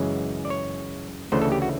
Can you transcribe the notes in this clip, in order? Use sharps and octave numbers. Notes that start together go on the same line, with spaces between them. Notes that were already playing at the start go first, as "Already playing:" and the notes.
Already playing: F#2 C#3 E3 G#3 C#5
D5
C#5
D2 C#3 E3 A3 C5
A4
G4
F#4